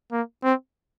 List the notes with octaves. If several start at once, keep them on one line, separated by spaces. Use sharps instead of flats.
A#3
C4